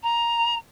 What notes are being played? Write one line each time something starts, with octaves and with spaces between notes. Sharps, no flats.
A#5